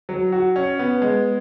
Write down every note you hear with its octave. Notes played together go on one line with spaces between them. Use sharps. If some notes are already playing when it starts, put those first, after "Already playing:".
F#3
F#4
C#4
B3
G#3